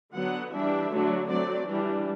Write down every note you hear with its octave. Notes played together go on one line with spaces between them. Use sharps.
D3 F#3 B3 F#5
E3 G3 D4 E5
D3 F#3 A3 D4
F#3 A3 C4 D5
E3 G3 D4